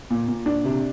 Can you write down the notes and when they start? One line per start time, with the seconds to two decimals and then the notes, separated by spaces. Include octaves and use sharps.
0.10 A#2
0.28 A#2
0.46 D4
0.64 C3